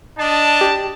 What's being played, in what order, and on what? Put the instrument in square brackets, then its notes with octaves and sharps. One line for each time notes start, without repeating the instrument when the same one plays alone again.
[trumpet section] D4 D#5 A5
[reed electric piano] G4